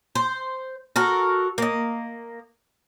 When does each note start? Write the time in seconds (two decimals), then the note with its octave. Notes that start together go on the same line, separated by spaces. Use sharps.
0.15 C5
0.96 F#4 A4 A#4
1.58 A#3 D#5